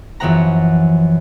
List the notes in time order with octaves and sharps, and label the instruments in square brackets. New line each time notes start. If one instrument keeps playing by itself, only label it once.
[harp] F#2 E3 F3 B3 F#5 A#5